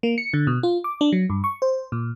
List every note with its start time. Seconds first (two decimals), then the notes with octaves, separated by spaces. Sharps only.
0.03 A#3
0.18 C#7
0.33 D3
0.47 B2
0.63 F4
0.84 D6
1.01 D4
1.12 F#3
1.30 G2
1.44 C#6
1.62 C5
1.92 A#2